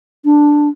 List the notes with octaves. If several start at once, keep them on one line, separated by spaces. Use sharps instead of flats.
D4